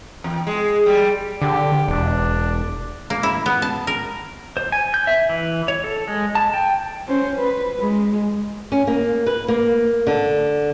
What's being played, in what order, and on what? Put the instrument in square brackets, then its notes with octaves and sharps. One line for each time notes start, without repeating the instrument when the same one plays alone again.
[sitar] E2
G#3
G3
[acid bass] D3 [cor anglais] G4
[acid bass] E1 [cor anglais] D4
[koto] A#3
E4
B3
A5
A#4
[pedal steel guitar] C5
G#5
G6
E5
E3
C#5
A4
G#3
A5
G5
[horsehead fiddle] C#4 C5
B4
G#3
[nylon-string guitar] C#4
A#3
B4
A#3
D3